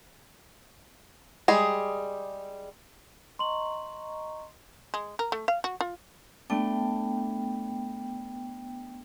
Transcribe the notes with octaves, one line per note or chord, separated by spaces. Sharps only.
G3 G#3 G#4
D#5 A#5 C6 C#6 F#7
G#3
A#4
A3
F5
F#4
F4
A3 B3 D4 G5